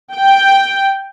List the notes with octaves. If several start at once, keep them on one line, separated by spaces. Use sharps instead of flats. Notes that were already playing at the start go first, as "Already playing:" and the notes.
G5